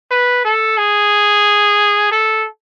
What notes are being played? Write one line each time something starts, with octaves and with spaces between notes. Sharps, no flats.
B4
A4
G#4
A4